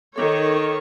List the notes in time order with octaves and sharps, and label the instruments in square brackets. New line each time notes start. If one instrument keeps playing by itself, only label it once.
[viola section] D#3 C#5 [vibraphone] A4 D6